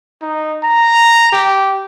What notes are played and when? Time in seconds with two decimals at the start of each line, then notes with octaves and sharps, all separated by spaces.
0.22 D#4
0.63 A#5
1.32 G4